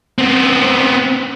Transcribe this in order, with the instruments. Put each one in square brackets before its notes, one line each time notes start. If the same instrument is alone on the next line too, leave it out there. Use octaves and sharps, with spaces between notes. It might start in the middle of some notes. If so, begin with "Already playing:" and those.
[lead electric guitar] B3 C4